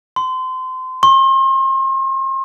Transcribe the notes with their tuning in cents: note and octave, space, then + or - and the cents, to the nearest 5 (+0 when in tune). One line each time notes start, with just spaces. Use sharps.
C6 -25
C6 +40